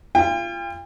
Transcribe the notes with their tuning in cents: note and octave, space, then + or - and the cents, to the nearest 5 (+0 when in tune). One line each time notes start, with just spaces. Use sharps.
F4 -25 G5 +40